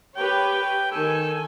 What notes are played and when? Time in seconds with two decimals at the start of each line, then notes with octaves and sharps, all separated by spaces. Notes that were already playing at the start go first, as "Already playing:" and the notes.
0.16 G4 B4 C#5 G5
0.92 D#3 A4 G#5